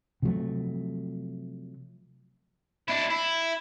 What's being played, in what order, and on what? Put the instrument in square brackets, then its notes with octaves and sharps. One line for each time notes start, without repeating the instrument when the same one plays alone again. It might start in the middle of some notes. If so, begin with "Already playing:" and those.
[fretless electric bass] C3 F3 F#3 A3
[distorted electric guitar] D4 E4
E4